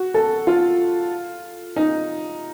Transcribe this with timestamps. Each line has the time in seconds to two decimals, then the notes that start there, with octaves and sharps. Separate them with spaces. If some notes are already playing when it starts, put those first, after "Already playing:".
Already playing: F#4
0.14 A4
0.47 F4
1.76 D#4